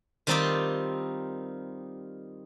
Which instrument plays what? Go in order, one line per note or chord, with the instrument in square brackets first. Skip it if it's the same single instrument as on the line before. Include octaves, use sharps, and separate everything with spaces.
[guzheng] D#3 G3 C4 D#4 F4 G4